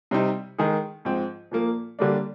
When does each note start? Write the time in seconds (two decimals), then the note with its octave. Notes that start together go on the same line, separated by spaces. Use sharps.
0.11 C3 G3 C4 D#4
0.58 D#3 G#3 D#4 G#4
1.05 G#2 F3 C4
1.51 A#2 F3 A#3
1.99 D3 G3 A#3 D4